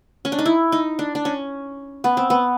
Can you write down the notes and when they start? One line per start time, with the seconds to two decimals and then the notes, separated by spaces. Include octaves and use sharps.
0.25 C#4
0.32 D4
0.39 D#4
0.46 E4
0.72 D#4
0.99 D4
1.15 D4
1.25 C#4
2.04 B3
2.17 C4
2.30 B3